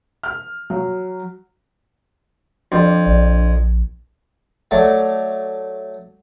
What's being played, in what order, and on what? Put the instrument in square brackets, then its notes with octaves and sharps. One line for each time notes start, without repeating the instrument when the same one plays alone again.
[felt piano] F6
F#3
[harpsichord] F2 [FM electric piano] D4 D5
[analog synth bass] A#1
[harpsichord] F#3 A3 D5